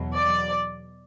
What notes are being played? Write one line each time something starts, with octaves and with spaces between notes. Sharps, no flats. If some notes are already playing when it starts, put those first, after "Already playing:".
Already playing: E2 B2 F#3
D5